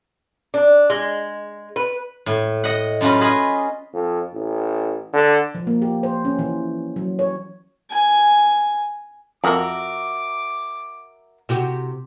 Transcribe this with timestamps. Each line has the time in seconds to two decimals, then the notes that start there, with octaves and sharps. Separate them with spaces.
0.54 D4
0.90 G#3
1.76 B4
2.26 A2
2.64 D#5 F#5
3.01 F#2 C#4 F4 F#4 B4
3.21 F4 G#4 B4 D#5 B5
3.93 F2
4.33 A1
5.13 D3
5.55 F3
5.67 A#3
5.82 G4
6.03 C5
6.25 C#4
6.39 E3
6.96 F#3
7.19 C#5
7.90 G#5
9.44 F2 F#4 A#4 E5 D6
11.49 C3 F#4 G4